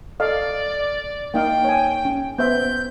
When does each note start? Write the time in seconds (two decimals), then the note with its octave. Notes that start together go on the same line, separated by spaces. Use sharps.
0.20 A4 D5 D#5 F5
1.34 A#3 D#4 F5 G5
1.65 C#5 G#5
2.05 C#4
2.38 B3 C5 E5 G6